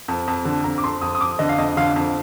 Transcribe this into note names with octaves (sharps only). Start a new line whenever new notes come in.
F2
F2
D3
F2 A#5
D6
F2 C6
F2 D#6
D#6
F2 D6
D3 D#5
F5
F2 D#5
D3 F5
F2